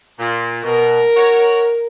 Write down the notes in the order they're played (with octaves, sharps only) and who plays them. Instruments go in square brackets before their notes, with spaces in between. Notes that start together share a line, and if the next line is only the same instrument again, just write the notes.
[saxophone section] A#2
[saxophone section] B2 [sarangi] A#4
[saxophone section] F#4 C#5